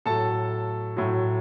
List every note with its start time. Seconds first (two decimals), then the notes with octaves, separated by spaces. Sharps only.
0.06 A2 F#3 A4 A5
0.97 A2 F#3